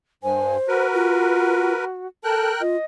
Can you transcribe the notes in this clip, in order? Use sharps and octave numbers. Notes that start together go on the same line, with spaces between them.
G2 C5 G#5
F#4 A#4 B4
F4
A4 A#4 G5 A5 F#6
F4 D#5